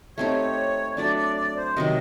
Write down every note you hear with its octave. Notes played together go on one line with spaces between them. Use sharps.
A3 C4 D#4 G4 C#5
F#3 A3 D4 D5
D5
D5
C5
C3 D#3 F#3 D#5